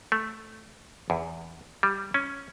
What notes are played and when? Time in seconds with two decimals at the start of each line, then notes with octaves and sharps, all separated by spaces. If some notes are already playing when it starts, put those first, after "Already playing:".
0.12 A3
1.10 E2
1.83 G3
2.14 C#4